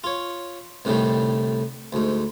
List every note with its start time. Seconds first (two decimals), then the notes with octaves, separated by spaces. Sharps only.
0.04 F4 C#5
0.85 C2 A2 D3 D#3 G3
1.93 D2 G#2